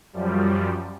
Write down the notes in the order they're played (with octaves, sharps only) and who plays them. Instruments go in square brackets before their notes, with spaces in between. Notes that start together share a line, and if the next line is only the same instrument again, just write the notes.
[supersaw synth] F#2 F3 G3